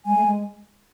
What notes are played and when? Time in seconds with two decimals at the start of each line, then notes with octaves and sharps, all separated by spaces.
0.06 G#3 G#5
0.15 A3
0.26 G#3